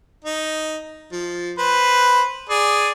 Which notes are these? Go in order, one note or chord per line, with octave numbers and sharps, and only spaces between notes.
D#4
F3
B4 C5
G#4 D5